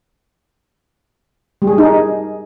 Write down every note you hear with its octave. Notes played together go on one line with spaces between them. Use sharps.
G3
G#4
G3
D#4
G#4